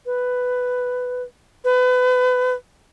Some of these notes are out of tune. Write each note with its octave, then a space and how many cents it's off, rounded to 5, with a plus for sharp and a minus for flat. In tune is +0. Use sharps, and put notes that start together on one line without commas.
B4 +10
B4 +30